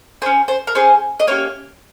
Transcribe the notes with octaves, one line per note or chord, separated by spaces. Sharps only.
C#4 G#4 C5
C5
A#4
C#4 G#4 C5
D#5
A#3 C#4 G4 C#5